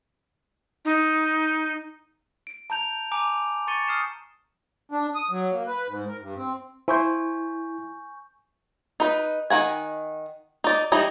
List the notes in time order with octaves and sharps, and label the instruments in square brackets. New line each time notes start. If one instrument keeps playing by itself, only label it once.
[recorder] D#4
[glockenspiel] D7
A5 A#5 G6 F7
G#5 A#5 D6 D7
C#6 A6 C#7 D#7 G7
D#6 F6 C7 E7
[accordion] D4
D#6
F#3
A#3
B4
G#2
A#4
G2
C4
[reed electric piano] E4 [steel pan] C5 [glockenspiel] G#5 C#6 G6
[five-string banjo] D#4 B4
D#3 F#5 G#5
D#4 D5
E3 G3 D#4 D#5